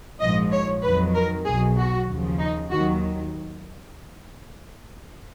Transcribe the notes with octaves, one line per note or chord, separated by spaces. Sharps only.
A#1 G#2 F3 D#5
C#5
F2 D#3 F#3 B4
A#4
B1 B2 F#3 G#4
F#4
D#2 C#3 F3
D#4
D#2 D#3 F#3 F#4